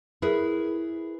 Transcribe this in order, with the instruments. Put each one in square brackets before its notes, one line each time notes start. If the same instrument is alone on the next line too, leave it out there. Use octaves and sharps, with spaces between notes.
[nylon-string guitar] E4 G#4 A#4 B4